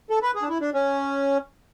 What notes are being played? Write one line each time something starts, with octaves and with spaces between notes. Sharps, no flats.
A4
B4
G#4
D4
E4
D4
C#4